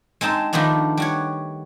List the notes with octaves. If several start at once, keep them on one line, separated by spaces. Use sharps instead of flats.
G#3 C4 D#4 A5
D#3 F3 A3 B3 D4
G3 F#4 C#5